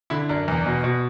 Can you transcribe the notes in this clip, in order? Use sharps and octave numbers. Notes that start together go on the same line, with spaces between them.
D3 E4
F#2 D4
E2
B2
B2